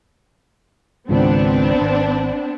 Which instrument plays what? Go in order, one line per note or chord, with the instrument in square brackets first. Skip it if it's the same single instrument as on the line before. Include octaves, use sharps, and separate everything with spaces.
[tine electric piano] G#1 C#2 [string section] B3 C4 D4
[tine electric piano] G#1